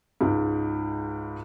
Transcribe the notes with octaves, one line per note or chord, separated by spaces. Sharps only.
C#2 G#2